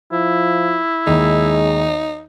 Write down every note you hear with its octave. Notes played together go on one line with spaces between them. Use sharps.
F3 E4
D#2 G#3 D#4